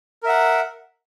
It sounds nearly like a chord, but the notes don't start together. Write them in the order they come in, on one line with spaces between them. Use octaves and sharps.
A#4 E5 F#5